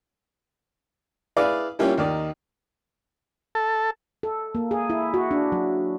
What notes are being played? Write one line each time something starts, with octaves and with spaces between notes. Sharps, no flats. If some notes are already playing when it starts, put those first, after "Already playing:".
E4 G#4 B4 D5 F5
G3 A#3 C#4 E4 F4 G4
D#2 D#3 D5
A4
A4
A#3
G#4
E4
F#4
D4
F#3